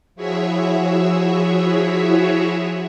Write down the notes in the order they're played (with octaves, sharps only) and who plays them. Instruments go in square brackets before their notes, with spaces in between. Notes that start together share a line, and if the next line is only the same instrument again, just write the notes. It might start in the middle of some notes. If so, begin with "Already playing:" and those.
[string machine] F3 E4 F#4 G#4 C#5 E5